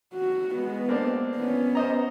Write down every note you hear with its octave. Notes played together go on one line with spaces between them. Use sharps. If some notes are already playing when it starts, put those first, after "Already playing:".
F#4
G#3 B3
A#3 C4 D4
B3 C#4
C5 D#5 A#5